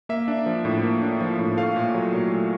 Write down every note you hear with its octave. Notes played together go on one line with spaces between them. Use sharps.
A#3 E5
D4
F3
A2
A#3
D4
F3
A2
A3 F5
A#2
F#3
A#2
A3